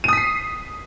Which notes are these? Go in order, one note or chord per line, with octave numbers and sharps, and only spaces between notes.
D#6 B6 C7 D#7